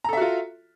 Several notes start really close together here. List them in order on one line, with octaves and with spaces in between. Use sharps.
A#5 A4 E5 F#4 F4